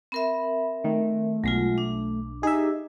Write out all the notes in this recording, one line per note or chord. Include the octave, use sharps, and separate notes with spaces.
C4 A#4 E5 B5
D#3 A3
B1 F#3 G#3 F4
D4
D#4 G4 G#4 E5